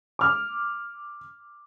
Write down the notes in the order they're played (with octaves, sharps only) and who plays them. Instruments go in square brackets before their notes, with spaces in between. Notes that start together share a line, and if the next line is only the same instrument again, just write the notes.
[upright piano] D6 F6